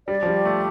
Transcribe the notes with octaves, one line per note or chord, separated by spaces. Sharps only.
G3 D5
F3
G3
G4
A3